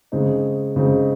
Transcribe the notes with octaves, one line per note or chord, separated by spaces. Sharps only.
C#3 G#3 C4 D#4
C#3 G#3 C4 D#4